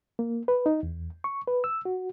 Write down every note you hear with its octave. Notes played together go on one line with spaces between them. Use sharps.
A#3
B4
D#4
E2
C#6
B4
E6
F#4